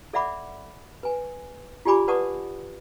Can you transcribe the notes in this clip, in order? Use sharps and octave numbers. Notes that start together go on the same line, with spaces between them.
A4 D5 E5 F#5 B5 D6
B4 G#5
F4 G4 D5 G#5 B5 D6
B4 D5 F#5 A5 C#6 D#6